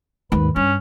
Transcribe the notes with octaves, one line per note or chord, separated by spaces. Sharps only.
D#2 G#2 B4
G2 C#4